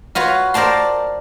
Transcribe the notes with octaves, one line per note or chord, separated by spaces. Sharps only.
F4 F#4 B4 C#5
A#4 C5 D5 A5 C6